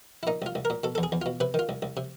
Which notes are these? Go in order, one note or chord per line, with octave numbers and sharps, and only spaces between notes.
E4
A#2 D#4
C2 F4
C2
A#4
A#2
B2 A4
A4
E2
G#4
E2
B2 F4
C3 B4
D#3 F4
C2
C2
C3